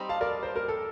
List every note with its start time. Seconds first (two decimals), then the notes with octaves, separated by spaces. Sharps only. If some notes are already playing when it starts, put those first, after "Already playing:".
Already playing: G3 C4 D#4
0.09 F5 A5
0.21 A#4 D5
0.43 C5
0.56 A#4
0.68 A4